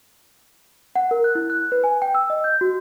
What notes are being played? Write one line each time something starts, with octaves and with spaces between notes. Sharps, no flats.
F#5
A#4
F#6
E4
F#6
B4
G#5
G5
E6
D#5
G6
F#4